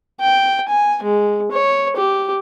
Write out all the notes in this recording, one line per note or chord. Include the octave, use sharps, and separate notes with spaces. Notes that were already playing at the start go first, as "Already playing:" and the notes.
G5
G#5
G#3
C#5
G4